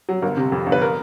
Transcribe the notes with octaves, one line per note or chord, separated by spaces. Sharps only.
F#3
G1 A#4
C3
F2
G1
B4
A#4